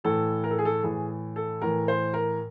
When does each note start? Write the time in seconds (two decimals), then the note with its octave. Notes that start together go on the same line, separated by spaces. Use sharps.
0.04 A2 E3 A4
0.44 A#4
0.51 A4
0.58 G#4
0.65 A4
0.83 A2 E3 G#4
1.36 A4
1.62 A2 E3 A#4
1.88 C5
2.14 A#4